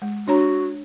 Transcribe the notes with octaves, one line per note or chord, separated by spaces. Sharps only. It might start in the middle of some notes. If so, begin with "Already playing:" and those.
G#3
D4 F#4 C#5 A#5